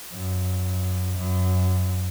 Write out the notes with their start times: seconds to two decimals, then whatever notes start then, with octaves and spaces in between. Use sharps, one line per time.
0.14 F#2
1.18 F#2